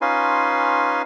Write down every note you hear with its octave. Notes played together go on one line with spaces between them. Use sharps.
C#4 D#4 F4 B4 G#5 C6